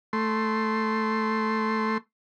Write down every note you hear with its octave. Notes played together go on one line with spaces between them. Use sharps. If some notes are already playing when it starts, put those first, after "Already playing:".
A3 C6